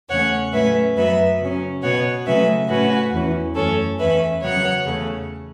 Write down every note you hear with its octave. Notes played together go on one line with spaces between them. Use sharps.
E2 C#3 A3 C#4 C#5 F#5
A2 F#3 A3 C#4 B4 E5
F#2 F#3 B3 B4 E5
C#3 F#3 C#4
B2 B3 C#5 F#5
C#3 F#3 A3 C#4 B4 E5
A2 A3 C#4 F#4 B4
E2 E3 C#4
F#2 E3 A3 C#4 A4 C#5
E2 E3 C#4 B4 E5
C#3 F#3 B3 C#5 F#5
E2 C#3 A3 C#4